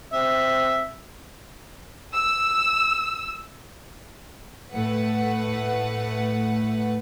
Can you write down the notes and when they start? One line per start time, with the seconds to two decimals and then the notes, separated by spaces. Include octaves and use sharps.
0.13 C4 E5
2.14 E6
4.73 A2 A3 B4 F#5